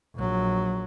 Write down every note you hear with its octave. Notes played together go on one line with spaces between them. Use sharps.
A#1 F#3